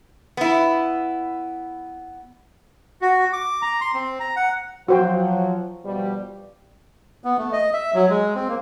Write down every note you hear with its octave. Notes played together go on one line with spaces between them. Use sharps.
B3 E4
F#4
D6
A#5
C6
C4
A#5
F#5
F3 F#3 F#4 C5 G5
B2 F3 G3
B3
A3
D#5
E5
F#3
G#3
C4
A#3